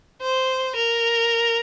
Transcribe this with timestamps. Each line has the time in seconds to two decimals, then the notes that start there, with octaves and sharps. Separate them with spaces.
0.21 C5
0.75 A#4